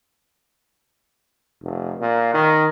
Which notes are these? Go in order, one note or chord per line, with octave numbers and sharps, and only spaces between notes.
F1
A#2
D#3